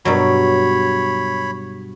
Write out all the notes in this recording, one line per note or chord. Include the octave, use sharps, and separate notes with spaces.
G2 B2 F#3 C#5 B5